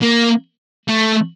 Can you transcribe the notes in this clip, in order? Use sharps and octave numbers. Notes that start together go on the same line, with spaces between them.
A#3
A3